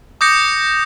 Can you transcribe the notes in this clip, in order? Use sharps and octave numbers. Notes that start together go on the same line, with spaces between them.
D6 D#6 G6 A#6 C#7